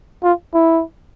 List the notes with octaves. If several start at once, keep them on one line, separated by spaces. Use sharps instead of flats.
F4
E4